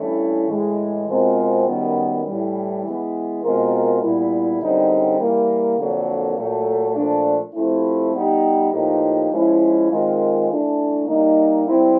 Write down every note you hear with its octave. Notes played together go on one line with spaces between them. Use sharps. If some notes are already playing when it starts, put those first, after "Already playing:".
Already playing: G2 E3 A3 C#4 E4
A2 E3 G#3
B2 G#3 C4 F4 A#4
F#2 D#3 G3 B3
A2 E3 G3
E3 G#3 B3
B2 G#3 C4 F4 A#4
A#2 G3 B3 E4
F#2 D3 G3 C4 D#4
E3 G3 A#3
F2 D3 F#3 A#3 D4
A#2 F#3 A3
A#2 F3 A3 D4
C3 F3 A3 C4 E4
G3 B3 D#4 G4
A2 F3 A#3 D#4 G4
F3 G#3 C#4 E4
D#3 G#3 C4 F4 A#4
E3 A3 D4
G3 A#3 D#4
G3 C4 E4